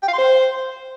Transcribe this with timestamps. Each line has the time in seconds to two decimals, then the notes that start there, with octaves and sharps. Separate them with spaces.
0.03 G5
0.08 F5
0.13 C6
0.18 C5